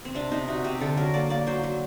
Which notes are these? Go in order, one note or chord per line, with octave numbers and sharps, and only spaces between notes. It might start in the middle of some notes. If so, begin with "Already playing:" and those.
C4
C3 D4
C3 D#4
C3 F#4
C3 G4
D3 A4
F#3 A#4
A#3 D5
A#3 D5
F#3 C5
F#3